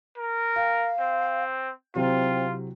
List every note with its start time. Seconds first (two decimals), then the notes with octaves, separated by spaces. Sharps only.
0.18 A#4
0.56 F5 G5
1.00 C4
1.95 C3 F#3 C4 E4 F4